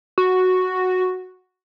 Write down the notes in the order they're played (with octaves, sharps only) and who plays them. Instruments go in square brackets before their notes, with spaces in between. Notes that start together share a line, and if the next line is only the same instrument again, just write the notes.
[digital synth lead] F#4